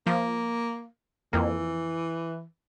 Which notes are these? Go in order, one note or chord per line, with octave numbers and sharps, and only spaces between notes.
F3 A#3
F2 E3 A#3